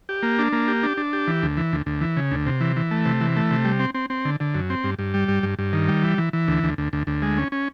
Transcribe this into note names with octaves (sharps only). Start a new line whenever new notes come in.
G4
A#3
D4
A#3
G4
D4
D4
G4
E3
D2
E3
D2
D2
E3
C#3
D2
C3
E3
E3
A3
C3
E3
A3
C3
G3
C4
C4
C4
D3
D3
F#2
C4
G2
G2
G3
G2
G2
G2
D#3
G3
E3
E3
E3
D2
D2
D2
D2
D2
G#3
C#4
C#4